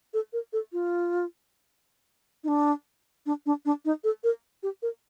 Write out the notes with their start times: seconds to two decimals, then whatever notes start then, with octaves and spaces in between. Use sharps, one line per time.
0.14 A4
0.33 A#4
0.53 A4
0.73 F4
2.44 D#4
2.48 D4
3.26 D4
3.46 D4
3.65 D4
3.85 D#4
4.04 A4
4.24 A#4
4.63 G4
4.82 A#4